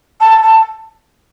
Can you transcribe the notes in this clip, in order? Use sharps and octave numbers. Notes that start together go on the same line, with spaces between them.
A5
A5